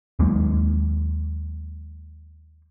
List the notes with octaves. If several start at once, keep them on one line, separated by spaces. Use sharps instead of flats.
D#2 F#3 G#3 A#3